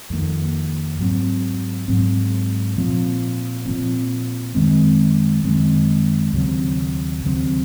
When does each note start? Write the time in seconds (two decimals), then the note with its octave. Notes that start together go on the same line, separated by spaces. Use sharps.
0.10 F2 D#3 A#3
0.99 G#2 F#3 C4
1.88 G#2 F#3 C4
2.77 A#2 F3 C4
3.65 A#2 F3 C4
4.55 F#2 D#3 G#3 C4
5.44 F#2 D#3 G#3 C4
6.33 D#2 C#3 F#3 C4
7.22 D#2 C#3 F#3 C4